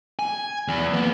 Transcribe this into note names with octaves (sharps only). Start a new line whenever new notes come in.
G#5
E2
A#3 B3